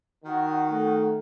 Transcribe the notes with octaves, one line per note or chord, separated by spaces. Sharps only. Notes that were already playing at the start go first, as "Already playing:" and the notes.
D#3 F#4 F#5
A3